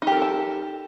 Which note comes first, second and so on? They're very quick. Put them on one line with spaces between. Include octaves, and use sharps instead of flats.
D#4 G4 A#4 A4 A5